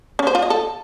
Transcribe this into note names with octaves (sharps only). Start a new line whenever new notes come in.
C#4
C5
F4
D#5
A4